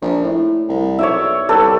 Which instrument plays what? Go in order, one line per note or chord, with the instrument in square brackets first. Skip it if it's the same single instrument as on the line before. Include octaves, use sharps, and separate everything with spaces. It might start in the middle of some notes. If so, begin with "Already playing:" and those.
[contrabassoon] A#1
A2
C2
[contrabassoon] B1 [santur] C#5 D5 E5
[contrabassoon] C2 [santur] G4 A4 B4